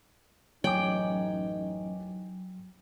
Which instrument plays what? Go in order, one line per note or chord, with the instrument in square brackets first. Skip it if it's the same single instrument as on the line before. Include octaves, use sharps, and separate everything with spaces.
[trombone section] A1 F#2 D#4 [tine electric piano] F#3 [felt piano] C#5 G#5 D6 [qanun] G5